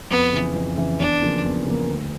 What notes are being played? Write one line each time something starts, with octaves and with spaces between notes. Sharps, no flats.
F2 B3
C#3 E3
F2
C#3 E3
E2 D4
C#3 F3 A#3
E2
C#3 F3 A#3
D2